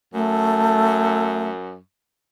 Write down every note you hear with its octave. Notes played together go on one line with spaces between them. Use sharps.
F#2 A3